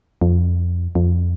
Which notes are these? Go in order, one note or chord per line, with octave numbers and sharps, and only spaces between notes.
F2
F2